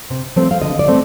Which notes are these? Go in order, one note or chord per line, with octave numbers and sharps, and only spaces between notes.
C3
F3 A3 C4
F5
D3 D#5
D5
A3 C4